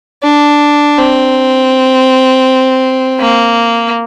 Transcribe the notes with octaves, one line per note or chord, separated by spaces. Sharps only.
D4
C4
A#3